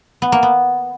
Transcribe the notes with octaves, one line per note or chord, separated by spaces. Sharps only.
B3
A#3
B3